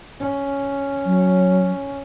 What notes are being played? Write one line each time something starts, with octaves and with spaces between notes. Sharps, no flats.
C#4
F#3